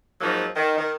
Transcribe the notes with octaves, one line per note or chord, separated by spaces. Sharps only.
G#2 F3 F#3 A#3 D#4
D#3
D#3